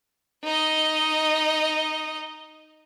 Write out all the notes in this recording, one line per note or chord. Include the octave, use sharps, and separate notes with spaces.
D#4 D#5